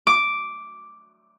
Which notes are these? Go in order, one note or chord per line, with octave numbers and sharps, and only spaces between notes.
D6